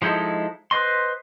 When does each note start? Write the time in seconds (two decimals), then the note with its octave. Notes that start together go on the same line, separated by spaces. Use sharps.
0.02 F3 G#3 D#4 E4 A4
0.71 B4 C5 D#5 C6